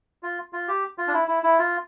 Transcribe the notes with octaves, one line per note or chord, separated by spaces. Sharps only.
F4
F4
G4
F4
D4
E4
E4
E4
F4